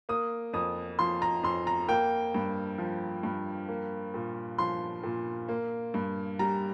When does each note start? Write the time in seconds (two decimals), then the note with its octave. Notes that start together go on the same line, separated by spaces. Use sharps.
0.09 A#3 D#6
0.53 F2 D#6
0.99 F3 C6
1.22 A#5
1.43 F2 C6
1.67 A#5
1.88 A#3 G5
2.34 G2
2.78 F3
3.23 G2
3.68 A#3
4.14 A#2
4.58 F3 C6
5.04 A#2
5.49 A#3
5.94 G2
6.39 G3 A#5